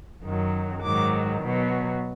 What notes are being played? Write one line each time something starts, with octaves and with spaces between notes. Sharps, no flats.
F#2 D#3 F#3
G#2 D#3 F#3 D6
B2 F#3